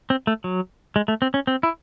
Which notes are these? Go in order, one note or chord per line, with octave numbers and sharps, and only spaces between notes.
C4
A3
F#3
G#3
A3
C4
C#4
C4
E4